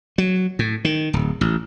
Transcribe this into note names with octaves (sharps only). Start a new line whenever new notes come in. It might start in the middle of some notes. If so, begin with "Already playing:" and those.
F#3
A2
D#3
D1
A1